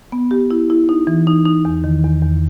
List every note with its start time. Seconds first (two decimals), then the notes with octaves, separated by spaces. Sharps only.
0.12 B3
0.31 G4
0.51 E4
0.70 E4
0.89 D#4
1.07 E3
1.27 D#4
1.46 D#4
1.65 E2
1.84 D#3
2.03 E2
2.23 E2